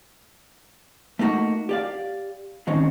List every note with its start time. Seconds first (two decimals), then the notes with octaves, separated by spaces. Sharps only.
1.19 A3 A#3 D#4 F#4
1.69 G4 D5 F5
2.67 A2 D#3 C4 C#4 D#4